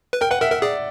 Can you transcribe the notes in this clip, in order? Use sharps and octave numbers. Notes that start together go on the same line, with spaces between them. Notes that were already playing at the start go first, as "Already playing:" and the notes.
B4
A#4 G5
B4 F#5
A#4 E5
A#4 E5
G#4 D5